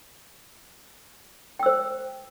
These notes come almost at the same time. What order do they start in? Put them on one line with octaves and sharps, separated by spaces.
G5 E6 C5